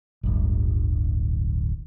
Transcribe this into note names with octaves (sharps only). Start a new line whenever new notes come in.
D1 G1